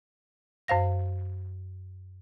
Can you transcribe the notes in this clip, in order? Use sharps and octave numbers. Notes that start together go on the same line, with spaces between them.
F#2 C5 F5 A#6